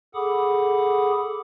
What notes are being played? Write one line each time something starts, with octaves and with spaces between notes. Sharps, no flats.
G#4 A4 F#5 B5 D6 D#6